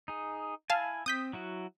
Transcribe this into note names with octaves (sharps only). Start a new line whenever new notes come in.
D#4 G#4
E4 F5 G#5 A5
C4 D#6 G6 B6
F#3 E4 F#4